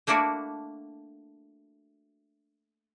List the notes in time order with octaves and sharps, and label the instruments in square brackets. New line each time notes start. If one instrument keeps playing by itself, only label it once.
[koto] A3 A#3 D4 E4 F#4